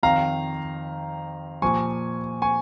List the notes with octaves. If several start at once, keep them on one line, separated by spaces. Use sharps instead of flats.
F2 D#3 F5 A#5
A#2 F3 G#5 C#6
G#5 C#6